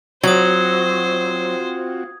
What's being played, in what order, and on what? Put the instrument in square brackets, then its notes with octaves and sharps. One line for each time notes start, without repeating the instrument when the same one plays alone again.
[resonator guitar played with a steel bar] F#3 [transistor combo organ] C4 F4 F#4 [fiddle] C5 [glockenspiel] D#6 G#6